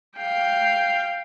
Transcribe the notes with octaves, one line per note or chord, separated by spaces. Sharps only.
F5 G5